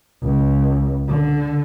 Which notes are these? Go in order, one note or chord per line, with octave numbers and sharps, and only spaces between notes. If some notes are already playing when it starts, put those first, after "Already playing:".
C#2
D3